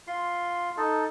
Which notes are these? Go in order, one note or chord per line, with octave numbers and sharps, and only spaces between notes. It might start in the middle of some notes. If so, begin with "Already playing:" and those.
F4 C6
D#4 A4